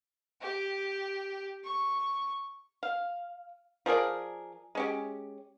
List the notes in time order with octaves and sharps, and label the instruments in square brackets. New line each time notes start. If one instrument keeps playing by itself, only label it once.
[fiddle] G4
C#6
[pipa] F5
F3 G#4 A#4 D5
G#3 C#4 G4